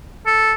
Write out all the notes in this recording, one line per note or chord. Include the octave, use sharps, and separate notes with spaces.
A4